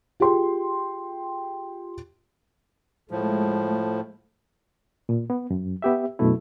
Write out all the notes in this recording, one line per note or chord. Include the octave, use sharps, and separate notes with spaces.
F4 G4 G#4 G5 C6
A2 F3 G#3 A3
A#2
B3
F#2
B3 G4 E5
F#2 B2 A3 E4